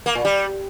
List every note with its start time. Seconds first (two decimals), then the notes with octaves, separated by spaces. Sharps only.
0.06 A#3
0.15 A#2
0.25 G3